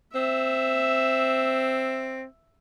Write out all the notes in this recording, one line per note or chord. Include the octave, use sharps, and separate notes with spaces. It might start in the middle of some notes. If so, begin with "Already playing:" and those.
C4 E5